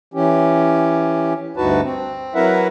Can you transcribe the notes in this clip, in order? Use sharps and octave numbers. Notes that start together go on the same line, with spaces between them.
E3 C#4 G4
D2 G2 D#4 F#4 B4 A5
C4
F#3 E4 A#4 B4 E5 F#5